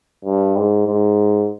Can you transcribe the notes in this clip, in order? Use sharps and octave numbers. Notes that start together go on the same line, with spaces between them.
G2
G#2
G#2